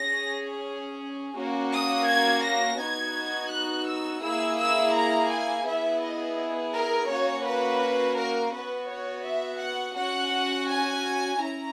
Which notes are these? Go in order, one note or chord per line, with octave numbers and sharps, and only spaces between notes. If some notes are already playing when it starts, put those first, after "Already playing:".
Already playing: C#4 G#4 A#6
A#3 C#4 F#4
D#6
G#6
A#6
B3 D#4 F#4 G#6
F#6
E6
A#3 E4 G#4 E6
E6
A#5
G#5
B3 E4 G#4 E5
D#5
A#4
A#3 C#4 F#4 C#5
B4
A#4
B3 F#4 B4
C#5
E5
F#5
C#4 F#4 F#5
G#5
C#4 E4 A#5